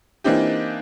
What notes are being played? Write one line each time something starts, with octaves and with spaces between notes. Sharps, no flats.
E3 A#3 C4 D4 D#4 G4